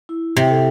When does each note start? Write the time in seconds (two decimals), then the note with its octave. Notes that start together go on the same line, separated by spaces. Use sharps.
0.09 E4
0.37 C3
0.50 A4 E5